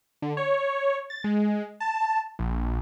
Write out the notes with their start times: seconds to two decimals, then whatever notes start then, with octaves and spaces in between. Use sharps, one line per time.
0.22 D3
0.37 C#5
1.10 A6
1.24 G#3
1.80 A5
2.39 A#1